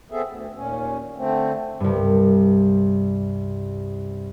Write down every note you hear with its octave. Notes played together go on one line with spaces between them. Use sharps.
B3 C4 G#4 A4 E5
D2
D#2 A#2 C#4
D3 A3 C4
C2 G2